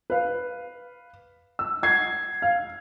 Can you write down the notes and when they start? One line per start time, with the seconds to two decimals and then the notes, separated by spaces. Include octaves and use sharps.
0.10 B4 F5
1.59 E6
1.83 F#5 G#6 C7
2.42 F5